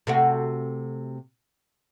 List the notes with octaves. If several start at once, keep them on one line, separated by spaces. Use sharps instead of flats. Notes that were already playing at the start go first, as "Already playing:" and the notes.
C3 A3 F#4